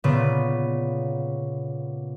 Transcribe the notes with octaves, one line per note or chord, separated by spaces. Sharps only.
A#2 C#3 B3